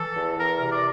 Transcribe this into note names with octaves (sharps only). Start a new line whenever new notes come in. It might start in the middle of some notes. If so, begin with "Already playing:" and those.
Already playing: E3 A4
E2
E2 A#4
A#4
C3
D5